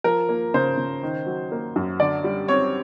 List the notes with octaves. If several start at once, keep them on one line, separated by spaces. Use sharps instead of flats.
F3 A#4
A#3
C#3 C5
C#3
D#3
F#3
A#3
F#2
D3 D5
G3
C4 C#5